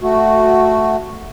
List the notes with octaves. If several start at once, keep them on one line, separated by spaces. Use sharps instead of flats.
A3 F#4